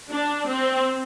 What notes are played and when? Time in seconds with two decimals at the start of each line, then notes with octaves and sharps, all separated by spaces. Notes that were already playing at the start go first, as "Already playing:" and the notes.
0.10 D4
0.48 C4